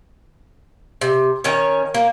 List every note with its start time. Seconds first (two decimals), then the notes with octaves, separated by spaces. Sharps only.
1.01 C3
1.44 D#3 C#4 C#5
1.94 A#3